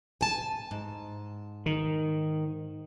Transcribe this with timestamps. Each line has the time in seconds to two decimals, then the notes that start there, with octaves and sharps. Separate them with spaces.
0.21 G#5 A5
0.71 G#2
1.66 D#3